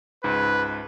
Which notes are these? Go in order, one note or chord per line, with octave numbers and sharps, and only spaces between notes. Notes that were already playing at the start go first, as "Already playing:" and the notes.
C#2 G#2 B4